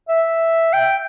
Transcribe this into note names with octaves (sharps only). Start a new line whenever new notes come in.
E5
G5